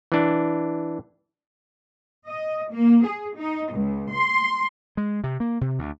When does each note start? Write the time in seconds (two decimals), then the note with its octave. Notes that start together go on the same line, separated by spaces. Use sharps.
0.12 E3 D4
2.27 D#5
2.71 A#3
3.05 G#4
3.38 D#4
3.74 C#2
4.13 C6
4.97 G#3
5.24 C3
5.40 A#3
5.61 C3
5.79 D2